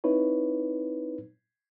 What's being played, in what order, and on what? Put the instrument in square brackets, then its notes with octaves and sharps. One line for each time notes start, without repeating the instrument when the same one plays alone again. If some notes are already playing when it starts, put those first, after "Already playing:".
[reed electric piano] C4 D#4 E4 B4 C#5